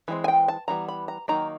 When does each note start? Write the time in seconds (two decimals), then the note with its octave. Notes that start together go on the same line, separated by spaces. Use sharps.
0.08 E3 G#3 C4
0.24 G#5
0.28 G5
0.48 A5
0.68 E3 G3 B3 A#5
0.88 B5
1.08 A#5
1.28 D#3 F#3 A#3 D#4 A#5